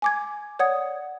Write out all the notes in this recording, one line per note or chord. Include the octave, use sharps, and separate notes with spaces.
G#5 D6 G#6
C#5 D5 F#5 D#6 G#6